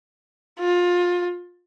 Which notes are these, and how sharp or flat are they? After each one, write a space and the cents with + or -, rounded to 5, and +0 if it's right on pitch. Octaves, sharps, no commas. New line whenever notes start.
F4 +20